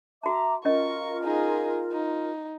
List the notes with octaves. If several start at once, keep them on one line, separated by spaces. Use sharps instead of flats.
F#4 E5 A5 A#5 D6
C#4 F4 A#4 D#5 C#6
D#4 G#4
D#4